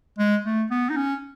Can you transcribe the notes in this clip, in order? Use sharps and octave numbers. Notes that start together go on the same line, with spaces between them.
G#3
A3
B3
D#4
C#4